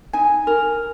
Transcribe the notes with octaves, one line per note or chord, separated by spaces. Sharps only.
D#4 G#5
A#4